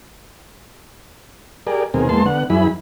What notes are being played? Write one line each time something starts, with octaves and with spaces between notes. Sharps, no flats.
G4 G#4 A#4 D5
D#2 B2 C4 G#4 A#4
E2 G#3 A#3 B3 A5 C6
D3 B3 F#5
F#2 E3 E4 G#4 B5